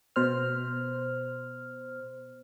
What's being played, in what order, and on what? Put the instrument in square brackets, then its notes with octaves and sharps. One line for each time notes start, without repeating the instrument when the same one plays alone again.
[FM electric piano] B2 C5 F6